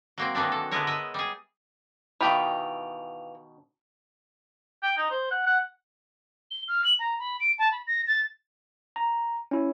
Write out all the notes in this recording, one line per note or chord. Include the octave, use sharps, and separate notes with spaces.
F#3 A#3 C4
D#3 E3 F#3 G3 D4
A4
D3 G#3 B3 E4 A#4 C#5
E4 D#5 E5
G3 G#4
B2 D#3 E3 G4 F5 B5 F7
G5
D#4
C5
F#5
F#5
G7
F6
F#7
A#5
B5
D7
A5
B5
A#6
A6
A#5
C#4 E4